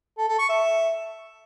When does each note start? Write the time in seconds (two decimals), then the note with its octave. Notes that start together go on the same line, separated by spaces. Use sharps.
0.18 A4
0.28 A4
0.39 C#6
0.49 E5